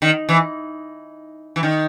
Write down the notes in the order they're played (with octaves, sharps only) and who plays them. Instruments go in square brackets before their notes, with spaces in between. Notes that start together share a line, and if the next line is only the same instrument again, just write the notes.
[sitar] D#3
E3
E3
D#3